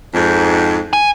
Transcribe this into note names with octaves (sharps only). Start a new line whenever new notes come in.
F2 G#2
G#5